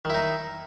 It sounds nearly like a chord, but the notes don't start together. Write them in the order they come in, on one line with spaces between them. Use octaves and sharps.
D#3 E4 D#4